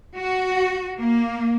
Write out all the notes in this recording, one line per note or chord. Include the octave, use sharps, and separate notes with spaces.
F#4
A#3